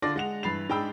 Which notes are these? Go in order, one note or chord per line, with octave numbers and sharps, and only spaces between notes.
D3 F4 D5 A5 A#6
G#3 F#5 F7
G2 E3 B5 A6 C7 F7
G#2 G#3 D4 G5 B5 E6